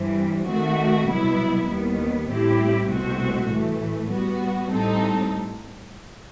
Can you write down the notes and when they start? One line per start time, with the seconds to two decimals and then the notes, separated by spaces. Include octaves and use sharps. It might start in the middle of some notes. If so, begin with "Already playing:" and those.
Already playing: G2 E3 G3 C4
0.47 D#3 A3 C4 F#4
1.08 C2 B2 F#3 B3 E4
1.68 D#2 D#3 G3 B3
2.29 A2 G3 C4 E4 G4
2.89 C2 B2 A3 C4 F#4
3.49 A2 E3 A3
4.10 G3 B3 F#4
4.70 A2 G3 C4 D#4 A4